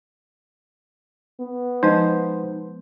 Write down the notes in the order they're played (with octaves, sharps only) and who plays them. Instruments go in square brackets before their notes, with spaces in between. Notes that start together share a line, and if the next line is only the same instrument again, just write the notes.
[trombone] B3
[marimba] F3 G#3 D#5 [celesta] D#4 [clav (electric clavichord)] C5